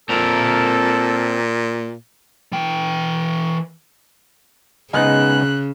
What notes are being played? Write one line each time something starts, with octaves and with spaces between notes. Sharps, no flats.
A#2 C4 A4 A#4
E3 G5
C#3 G#3 B3 D#4 F#6